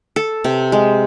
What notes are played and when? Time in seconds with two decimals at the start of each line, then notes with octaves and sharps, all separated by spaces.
0.16 A4
0.44 C3
0.72 G#3